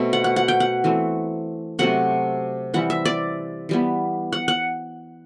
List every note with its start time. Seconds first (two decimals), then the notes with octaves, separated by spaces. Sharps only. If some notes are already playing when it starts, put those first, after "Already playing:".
Already playing: B2 A3 C4
0.13 F#5
0.24 F#5
0.36 F#5
0.48 G5
0.60 F#5
0.84 E3 A3 C4
1.79 C3 F#3 A3 C4 F#5
2.74 E3 G3 C4 F#5
2.90 E5
3.05 D5
3.69 E3 G3 B3
4.33 F#5
4.48 F#5